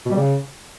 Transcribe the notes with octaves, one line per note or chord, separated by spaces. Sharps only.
B2
G3
C#3